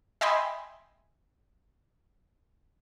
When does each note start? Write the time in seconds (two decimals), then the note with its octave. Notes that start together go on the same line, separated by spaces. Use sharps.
0.21 D#5 E5 G5 G#5 B5 C6